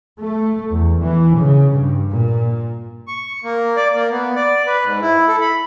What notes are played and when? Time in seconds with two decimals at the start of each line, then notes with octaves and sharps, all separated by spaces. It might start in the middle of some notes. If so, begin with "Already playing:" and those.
0.20 A3
0.71 E2
1.02 E3
1.36 C#3
1.74 G2
2.10 A#2
3.08 C#6
3.44 A#3
3.77 D5
3.94 A#3
4.11 B3
4.36 D5
4.67 B4
4.85 G#2
5.02 E4
5.28 A4
5.41 B5